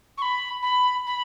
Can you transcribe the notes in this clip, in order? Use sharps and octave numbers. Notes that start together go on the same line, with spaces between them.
C#6
B5
B5
B5